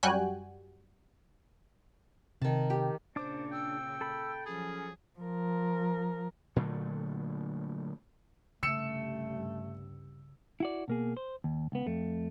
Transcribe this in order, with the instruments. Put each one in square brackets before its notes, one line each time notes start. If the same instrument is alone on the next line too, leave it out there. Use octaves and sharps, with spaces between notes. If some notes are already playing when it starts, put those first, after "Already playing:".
[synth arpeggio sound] F#2 G3 F#4 G5 G#5 F#6
[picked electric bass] C3 [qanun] D#3 A5
[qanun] G4
[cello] A#2 C#3 [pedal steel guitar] D4 D6 [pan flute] C5
[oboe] G5 [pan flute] E6
[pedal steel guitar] A4 B5
[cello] F3 F#3 [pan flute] C#4 [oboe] G#4
[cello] F3 A#4
[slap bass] A#2 D3 F#3 A3
[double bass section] C2 G2 [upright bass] C#3 [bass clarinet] A3 [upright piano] E6 C#7 E7
[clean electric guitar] E4 F#4 D5
B2 A#3 G#4
C5
D#2
C#2 B3
F2 A3